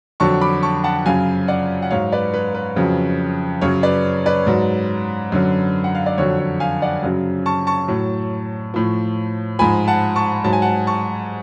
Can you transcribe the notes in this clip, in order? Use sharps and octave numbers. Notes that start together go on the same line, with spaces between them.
F2 D3 F#3 A5 C#6
B5 D6
A5 C#6
F#5 A5
F#2 C#3 F#3 F5 G#5
D5 F#5
F#5
G#2 F#3 C#5 F5
B4 D5
B4
B4
F2 C#3 F#3
F#2 C#3 F#3 C#5
B4 D5
B4 D5
G#2 F#3
F#2 D3 F#3
F#5
F5
D5
F2 D3 F#3 C#5
C#5
F5 G#5
D5 F#5
F#2 C#3 F#3
A5 C#6
A5 C#6
A2 F#3
A2 F3
G#2 F3 G#5 B5
F#5 A5
A5 C#6
G#2 F#3 A5
G#5
F#5 A5
A5 C#6